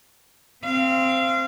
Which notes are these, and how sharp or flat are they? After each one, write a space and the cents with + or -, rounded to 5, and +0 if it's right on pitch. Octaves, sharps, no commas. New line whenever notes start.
C4 +0 F5 -30